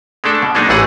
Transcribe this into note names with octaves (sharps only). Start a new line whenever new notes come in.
G#3 A3 D4 A4
B2
F#3 G#3 A#3 D4 D#4
A1 G#2 E3 A3 G#4 F#5